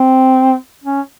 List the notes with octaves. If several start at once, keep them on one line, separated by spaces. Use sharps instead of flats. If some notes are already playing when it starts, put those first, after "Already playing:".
Already playing: C4
C#4